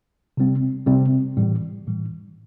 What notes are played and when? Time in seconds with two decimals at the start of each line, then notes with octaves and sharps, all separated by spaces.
0.37 C3 G3 C4
0.87 C3 G3 C4
1.37 A2 E3 G3
1.87 A2 E3 G3